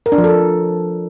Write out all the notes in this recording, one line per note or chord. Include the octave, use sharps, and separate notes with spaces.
A#4
D4
F3
A4